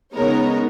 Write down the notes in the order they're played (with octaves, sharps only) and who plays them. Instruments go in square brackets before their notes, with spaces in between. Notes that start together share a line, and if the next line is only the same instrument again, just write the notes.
[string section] C#3 G#3 B3 D#4 A#4 C#5